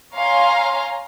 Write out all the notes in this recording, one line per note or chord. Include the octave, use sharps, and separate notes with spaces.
C#5 F5 G#5 A#5 C6